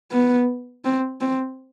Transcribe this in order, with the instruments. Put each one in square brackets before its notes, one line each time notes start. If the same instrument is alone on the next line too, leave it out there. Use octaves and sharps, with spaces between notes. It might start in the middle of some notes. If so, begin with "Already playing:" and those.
[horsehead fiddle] B3
C4
C4